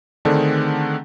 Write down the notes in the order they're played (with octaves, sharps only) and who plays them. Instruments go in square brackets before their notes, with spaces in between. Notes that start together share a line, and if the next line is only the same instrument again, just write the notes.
[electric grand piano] D3 D#3 A3 C4 D4 G#4